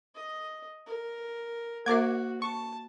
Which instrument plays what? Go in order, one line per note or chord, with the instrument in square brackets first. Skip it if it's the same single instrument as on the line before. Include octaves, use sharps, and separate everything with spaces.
[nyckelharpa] D#5
A#4
[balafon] A#3 C5 E5 [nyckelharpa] F#4 [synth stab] A#4 D6 G#6
[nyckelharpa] A5 [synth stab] C#6